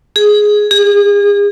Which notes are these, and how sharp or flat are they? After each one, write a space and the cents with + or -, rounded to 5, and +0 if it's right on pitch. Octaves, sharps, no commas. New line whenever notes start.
G#4 +5
G#4 -35